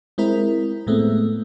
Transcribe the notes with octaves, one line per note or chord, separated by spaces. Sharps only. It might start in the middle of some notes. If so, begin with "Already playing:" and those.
G#3 C4 E4 A#4
A2 G#3 A3 B3 C4